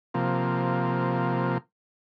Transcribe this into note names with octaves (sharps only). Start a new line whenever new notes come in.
C3 F3 A#3